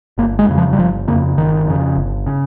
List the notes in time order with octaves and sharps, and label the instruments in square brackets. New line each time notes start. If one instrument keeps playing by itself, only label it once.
[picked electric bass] G1 A#3
G#3
F2 C#3
F3
G3
G1 F3
F2 C#3 A#3
G1 D#3
F2 C#3
G1
C#3